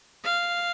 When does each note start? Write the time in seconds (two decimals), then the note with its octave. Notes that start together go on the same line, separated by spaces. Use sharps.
0.24 F5